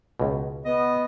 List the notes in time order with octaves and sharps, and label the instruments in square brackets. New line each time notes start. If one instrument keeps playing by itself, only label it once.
[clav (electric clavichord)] C#2 B2
[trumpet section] B3 [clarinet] D#5